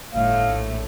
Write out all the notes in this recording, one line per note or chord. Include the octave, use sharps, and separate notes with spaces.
G1 A2 A3 F5
A#1